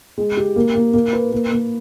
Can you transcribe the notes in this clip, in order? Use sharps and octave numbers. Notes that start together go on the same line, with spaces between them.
G#3
G4
A#3
A#3
A#3
B4
A#3
A#3